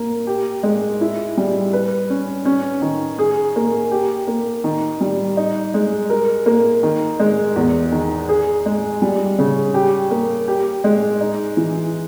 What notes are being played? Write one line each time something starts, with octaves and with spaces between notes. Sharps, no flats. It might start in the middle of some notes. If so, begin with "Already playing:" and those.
Already playing: A#3
G4
G#3
E4
G3
B4
C#4
C#4
D#3
G#4
A#3
G4
A#3
D#3
G3
D#4
G#3
A#4
A#3
D#3
G#3
E2
D#3
G#4
G#3
G3
C#3
G4
A#3
G4
G#3
D#4
E3